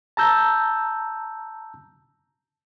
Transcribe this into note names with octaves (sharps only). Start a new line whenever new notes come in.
A5 A#5 E6 G6